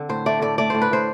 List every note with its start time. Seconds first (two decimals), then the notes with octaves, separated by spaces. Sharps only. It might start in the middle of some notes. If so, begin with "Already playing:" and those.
Already playing: D3 C4
0.09 A2 C5
0.26 A3 D5
0.42 A2 D5
0.58 A3 D5
0.70 A2 C5
0.82 B4
0.91 A2 C5